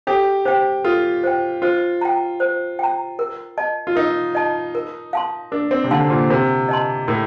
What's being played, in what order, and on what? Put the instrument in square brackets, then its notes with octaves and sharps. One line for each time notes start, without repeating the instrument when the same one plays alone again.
[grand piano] G4 [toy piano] A4
[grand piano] G4 [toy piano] C5 G5
[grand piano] F4 [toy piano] A4
[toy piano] C5 G5
[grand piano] F4 [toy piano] C5
[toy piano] G5 A#5
C5
G5 A#5
A#4
D#5 A5
[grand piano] F4
[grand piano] D#4 [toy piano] A#4
[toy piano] D#5 A5
A#4
F5 A5 C6
[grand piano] D4 [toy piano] A#4
[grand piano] C4
C3
[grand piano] D3 [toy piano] F5 A5 C6
[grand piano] A#2
[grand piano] C3 [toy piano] A#4
[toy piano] D#5 A5 C6
[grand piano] A2 [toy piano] A#4